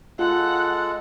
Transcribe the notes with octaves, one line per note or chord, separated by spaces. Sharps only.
G#3 F4 A4 F#5